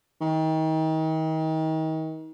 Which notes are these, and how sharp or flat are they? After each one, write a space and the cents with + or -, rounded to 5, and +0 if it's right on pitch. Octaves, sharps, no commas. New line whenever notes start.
D#3 +35